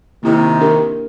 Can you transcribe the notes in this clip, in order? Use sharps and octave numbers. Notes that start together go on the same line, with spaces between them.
C3 D#3 A#3 E4
D4 G4 A#4